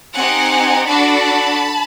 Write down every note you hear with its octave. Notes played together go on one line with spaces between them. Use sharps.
C4 D#4 G4 F#5 G#5
D4 F#4 A4 A5 B5